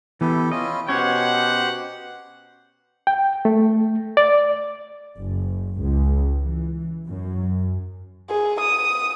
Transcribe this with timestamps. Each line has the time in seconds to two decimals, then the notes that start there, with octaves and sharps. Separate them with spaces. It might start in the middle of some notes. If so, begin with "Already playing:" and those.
0.21 E3 B3 E4 G4 A4
0.52 C#4 E4 F4 D#5
0.88 B2 C#4 G4 C5 C#5 F#5
3.07 G5
3.45 A3
4.17 D5
5.18 F#1
5.82 C#2
6.44 E3
7.08 F#2
8.30 G#4
8.60 D#6